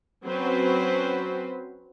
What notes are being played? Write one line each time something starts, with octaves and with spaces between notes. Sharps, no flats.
F#3 C4 C#4 B4 C5